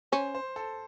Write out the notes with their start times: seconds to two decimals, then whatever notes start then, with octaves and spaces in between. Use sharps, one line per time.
0.12 C#4 C5
0.35 C5
0.56 A4